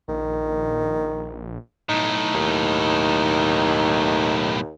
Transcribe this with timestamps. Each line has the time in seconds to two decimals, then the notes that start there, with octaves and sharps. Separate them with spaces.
0.08 A#1 D#3
1.89 B1 A2 D#4
2.34 D#2